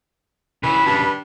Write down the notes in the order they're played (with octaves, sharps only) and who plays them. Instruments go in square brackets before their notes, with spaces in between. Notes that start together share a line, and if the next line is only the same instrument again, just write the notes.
[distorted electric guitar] D#2 C#3 [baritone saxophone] E3 [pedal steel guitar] B4
[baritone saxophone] G2